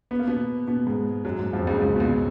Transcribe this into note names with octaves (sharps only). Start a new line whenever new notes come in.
B3
A#3
B2 B3
B2 B3
G#2 G#3
F#2 F#3
G#2 G#3
F2 F3
C#2 C#3
C#2 C#3
B2
C#2 C#3